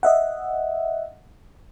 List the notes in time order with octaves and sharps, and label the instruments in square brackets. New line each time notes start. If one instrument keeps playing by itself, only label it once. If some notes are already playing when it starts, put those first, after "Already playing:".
[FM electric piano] D#5 E5 F#5